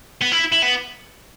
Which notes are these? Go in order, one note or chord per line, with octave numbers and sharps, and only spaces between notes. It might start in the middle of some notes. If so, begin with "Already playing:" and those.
B3
E4
E4
B3